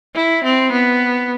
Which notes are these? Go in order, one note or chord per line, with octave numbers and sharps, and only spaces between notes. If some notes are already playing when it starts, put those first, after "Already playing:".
E4
C4
B3